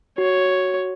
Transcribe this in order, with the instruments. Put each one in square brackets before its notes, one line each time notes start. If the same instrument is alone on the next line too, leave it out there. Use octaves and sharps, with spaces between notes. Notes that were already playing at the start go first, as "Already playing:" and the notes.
[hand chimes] F#4 [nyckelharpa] C#5